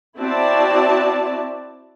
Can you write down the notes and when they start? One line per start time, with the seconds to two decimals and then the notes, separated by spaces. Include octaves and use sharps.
0.18 C4 E4 F#4 D5 A5